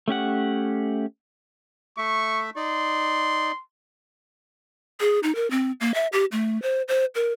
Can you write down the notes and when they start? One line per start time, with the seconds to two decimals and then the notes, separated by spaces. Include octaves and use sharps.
0.08 A3 C#4 G4 F#5
1.98 A3 E5 C#6
2.56 D#4 D5 C6
5.00 G#4
5.23 D#4
5.35 A#4
5.51 C4
5.81 A#3
5.94 E5
6.13 G4
6.32 A3
6.62 C5
6.88 C5
7.15 A#4